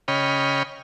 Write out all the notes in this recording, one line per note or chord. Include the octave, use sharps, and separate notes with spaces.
C#3 C#5 D#5 G5 B5 F6